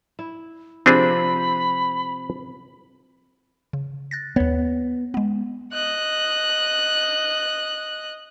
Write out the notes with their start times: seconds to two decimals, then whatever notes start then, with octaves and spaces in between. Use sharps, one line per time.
0.19 E4
0.86 C3 F3 C4 D4 G#4 B5
3.73 C#3
4.11 F#6 A6 A#6
4.36 D#2 B3 C#5
5.14 G#3 B3
5.73 D#5 F#6